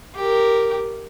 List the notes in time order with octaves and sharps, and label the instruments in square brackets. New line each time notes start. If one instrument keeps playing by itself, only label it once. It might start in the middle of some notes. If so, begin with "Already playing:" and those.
[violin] G4 A#4